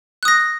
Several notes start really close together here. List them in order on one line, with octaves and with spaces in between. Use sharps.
F#6 D#6 A#6